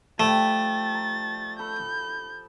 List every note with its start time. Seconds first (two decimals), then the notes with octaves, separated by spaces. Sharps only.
0.20 F3 G3 A3 G4 A6
0.94 A#5
1.59 A4 B5 G6